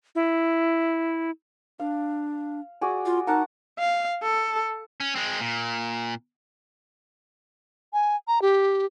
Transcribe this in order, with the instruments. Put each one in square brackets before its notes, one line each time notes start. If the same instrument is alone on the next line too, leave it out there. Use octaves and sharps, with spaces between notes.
[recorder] E4
[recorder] D4 [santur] F5
[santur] F#4 G#4 D5
[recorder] F4
[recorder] D#4 [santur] A#4 F#5 A5
[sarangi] F5
A4
[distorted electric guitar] C#4
G#3 C4
A#2
[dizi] G#5
A#5
G4